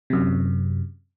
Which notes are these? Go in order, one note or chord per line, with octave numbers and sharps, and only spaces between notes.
F#2 C3